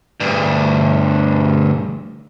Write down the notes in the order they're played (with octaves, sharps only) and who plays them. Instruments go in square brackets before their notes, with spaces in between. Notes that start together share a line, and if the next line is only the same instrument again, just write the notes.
[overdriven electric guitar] D2 G2